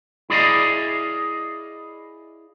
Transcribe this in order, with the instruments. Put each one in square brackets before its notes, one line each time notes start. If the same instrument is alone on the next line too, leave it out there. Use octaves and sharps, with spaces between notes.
[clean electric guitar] E4 G#4 D5 D#5 F5